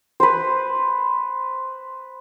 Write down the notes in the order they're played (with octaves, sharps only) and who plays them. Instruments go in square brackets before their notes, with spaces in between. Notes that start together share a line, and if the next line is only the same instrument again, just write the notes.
[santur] B4 C5